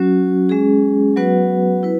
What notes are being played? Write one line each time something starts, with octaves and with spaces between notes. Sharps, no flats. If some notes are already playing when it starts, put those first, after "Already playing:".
Already playing: F#3 C#4 F#4
G#3 C#4 G#4
F#3 B3 F#4 B4 F#5
E4 B4